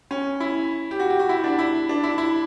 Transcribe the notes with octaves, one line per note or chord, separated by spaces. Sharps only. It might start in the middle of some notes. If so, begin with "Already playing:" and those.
C#4
E4
G4
F#4
G4
F#4
E4
D4
E4
D4
E4
E4